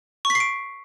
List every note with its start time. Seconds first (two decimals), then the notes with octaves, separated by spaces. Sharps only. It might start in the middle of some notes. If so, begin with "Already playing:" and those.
0.25 C#6
0.30 B6
0.35 C7
0.40 D7